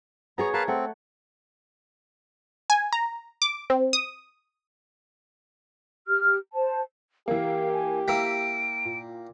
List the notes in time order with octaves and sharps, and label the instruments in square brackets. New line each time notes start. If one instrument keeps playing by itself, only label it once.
[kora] B3 G#4 C#5 [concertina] A#5
[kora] A#4 [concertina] B4 F5 A5
[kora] A3 F#5 [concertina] C4
[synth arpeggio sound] G#5
A#5
D6
C4
D#6
[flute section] G4 F6
C5 A5
[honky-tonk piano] E3 A#3 [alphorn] G4 [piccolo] F5
[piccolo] G#5
[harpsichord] A#3 E4 G5 [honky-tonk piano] E6 B6 [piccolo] D7
[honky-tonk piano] A#2